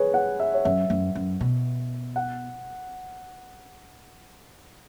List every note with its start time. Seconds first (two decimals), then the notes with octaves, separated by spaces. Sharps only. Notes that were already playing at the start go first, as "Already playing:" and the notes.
Already playing: G#4 B4 C#5
0.14 F#5
0.40 E5
0.54 C#5
0.65 F#2 E5
0.90 F#2
1.15 F#2
1.41 B2
2.16 F#5